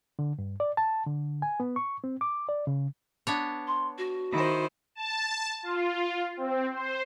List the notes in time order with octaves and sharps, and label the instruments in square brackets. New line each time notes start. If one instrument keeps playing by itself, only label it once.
[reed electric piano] D3
G2
D5
A5
D3
G#5
B3
C#6
C4
D6
D5
C#3
[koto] B3 D4 C#5
[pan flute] C6
F#4
[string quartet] D#3 E4 C5
[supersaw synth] A5
F4
C4
C5